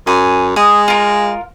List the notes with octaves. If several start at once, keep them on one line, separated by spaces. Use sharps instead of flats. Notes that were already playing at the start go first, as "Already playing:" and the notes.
F#2 G#5
G#3 D#6
F4 A#4